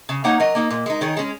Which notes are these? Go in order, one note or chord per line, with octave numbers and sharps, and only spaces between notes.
C#3
A#3 D#4 C#5 F#5
F#3 A#4 D#5
A#3 D#4
A#2
G#3 D#4
D#3 G#4 C#5
G#3 C#4